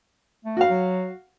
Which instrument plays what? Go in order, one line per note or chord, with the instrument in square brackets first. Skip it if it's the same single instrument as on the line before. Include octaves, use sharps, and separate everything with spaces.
[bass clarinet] A3
[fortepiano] F#4 F5
[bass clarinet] F#3